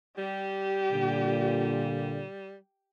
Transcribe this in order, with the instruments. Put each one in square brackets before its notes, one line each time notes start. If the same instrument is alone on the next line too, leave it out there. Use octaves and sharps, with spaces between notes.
[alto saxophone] G3 [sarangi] G4
[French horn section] A#2 D3